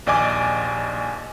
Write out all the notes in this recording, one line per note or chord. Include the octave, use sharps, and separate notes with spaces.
A#1 D#2 D5 D#5 G#5 D6